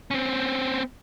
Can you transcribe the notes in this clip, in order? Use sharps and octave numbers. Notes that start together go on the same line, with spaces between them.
C4 C#4